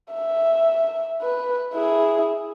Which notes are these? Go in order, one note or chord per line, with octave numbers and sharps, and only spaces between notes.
E5
B4
E4 G#4